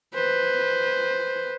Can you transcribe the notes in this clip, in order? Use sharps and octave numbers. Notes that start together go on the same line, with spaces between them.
B4 C5